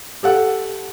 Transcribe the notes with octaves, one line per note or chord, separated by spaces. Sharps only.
G4 A4 F#5